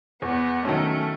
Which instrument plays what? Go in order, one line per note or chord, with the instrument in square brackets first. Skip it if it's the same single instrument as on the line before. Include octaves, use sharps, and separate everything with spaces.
[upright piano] E2 [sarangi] B3
[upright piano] D#3 F#3 C#4 [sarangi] A3